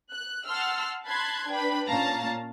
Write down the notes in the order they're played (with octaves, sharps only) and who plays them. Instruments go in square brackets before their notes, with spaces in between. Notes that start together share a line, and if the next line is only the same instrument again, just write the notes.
[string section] F#6
F#5 A5 C6 E6 F6
A5 B5 C6 F#6 G#6
D4 B4 G5 B5
A#2 C#4 F5 A5 A#5